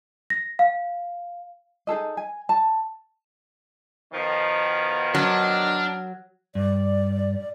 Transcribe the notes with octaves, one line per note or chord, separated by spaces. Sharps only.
A#6
F5
D#4 G#4 A4 D#5
G#5
A5
B2 D#3 F3
F#3 D4 A#4
G2 D5